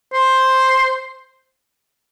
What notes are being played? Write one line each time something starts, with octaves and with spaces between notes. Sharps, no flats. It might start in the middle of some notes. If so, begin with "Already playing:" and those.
C5